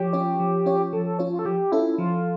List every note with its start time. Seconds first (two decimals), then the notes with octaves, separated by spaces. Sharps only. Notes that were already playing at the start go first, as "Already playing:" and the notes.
Already playing: F3 G4 C#5
0.13 C#4 F4 C#5
0.40 F3
0.66 C#4 F4 C#5
0.93 F3 A4
1.05 A4
1.19 C#4 F4 C#5
1.32 F4
1.39 A4
1.45 F3 G4
1.72 C#4 E4 F4 A4
1.98 F3 F4